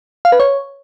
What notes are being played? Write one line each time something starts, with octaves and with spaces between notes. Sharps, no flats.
F5
B4
C#5